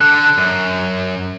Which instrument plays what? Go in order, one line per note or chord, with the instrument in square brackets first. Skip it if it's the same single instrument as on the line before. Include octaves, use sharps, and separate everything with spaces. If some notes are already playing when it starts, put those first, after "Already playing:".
[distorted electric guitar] D3 A4 [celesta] F#6
[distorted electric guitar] F#2